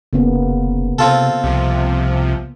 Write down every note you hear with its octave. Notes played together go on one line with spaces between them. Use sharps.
F1 C#3 A#3 B3
C3 C4 F4 A4
C2 C3 F3